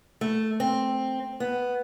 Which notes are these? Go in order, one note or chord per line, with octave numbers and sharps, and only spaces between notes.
A3
C4
B3